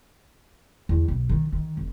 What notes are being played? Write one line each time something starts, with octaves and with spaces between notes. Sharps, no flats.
E2
B1
D#3
D#3
F1